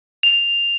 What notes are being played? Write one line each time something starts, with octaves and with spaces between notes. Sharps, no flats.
F7